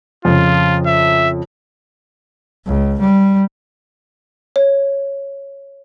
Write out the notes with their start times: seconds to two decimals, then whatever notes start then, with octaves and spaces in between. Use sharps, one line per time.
0.25 F2 C#3 F4
0.86 E5
2.66 C#2
3.01 G3
4.56 C#5